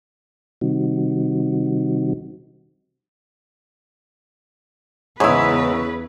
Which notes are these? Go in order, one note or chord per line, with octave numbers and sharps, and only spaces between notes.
C3 D#3 G3 C4 D#4 F#4
E2 G#2 C#3 E4 G#4 B4 C#5 E6